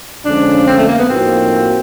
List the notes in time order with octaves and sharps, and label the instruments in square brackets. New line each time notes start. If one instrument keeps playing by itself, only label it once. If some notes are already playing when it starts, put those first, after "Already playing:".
[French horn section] F2 D3 F3 G#3 C#4 [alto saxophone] D4
[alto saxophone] C4
A3
A#3
B3
[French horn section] A2 F3 A#3 D#4 F#4 [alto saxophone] C4